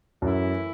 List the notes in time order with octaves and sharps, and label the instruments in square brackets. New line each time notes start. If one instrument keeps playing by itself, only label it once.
[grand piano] F#2 [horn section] E3 A3 E4